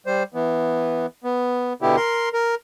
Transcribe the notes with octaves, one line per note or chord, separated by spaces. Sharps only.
G3 C5
E3 B3
B3
B2 D3 B3 E4 G4
A#4 C6
A#4